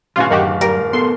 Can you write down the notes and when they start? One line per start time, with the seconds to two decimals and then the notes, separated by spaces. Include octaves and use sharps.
0.16 D1 B1 C#4 F4 F#4 F5 G#5
0.31 F#2 D#3 F#4 G4
0.61 G3 A#4
0.93 B3 A4 C6